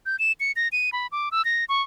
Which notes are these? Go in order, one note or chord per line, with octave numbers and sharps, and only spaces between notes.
G6
E7
C#7
A#6
D#7
B5
D6
E6
A#6
C#6